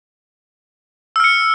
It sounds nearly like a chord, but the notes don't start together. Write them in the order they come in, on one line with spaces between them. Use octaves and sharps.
E6 F6 C#7